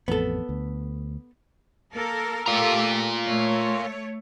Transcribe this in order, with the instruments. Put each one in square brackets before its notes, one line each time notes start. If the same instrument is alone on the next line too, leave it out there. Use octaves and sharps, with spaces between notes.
[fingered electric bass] A1 F2 [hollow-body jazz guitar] B3 A4
[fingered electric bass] D2
[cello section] A#3 A4 A#4
[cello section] A3 G4 A4 [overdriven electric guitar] F4 A#4
[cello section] A3 C#5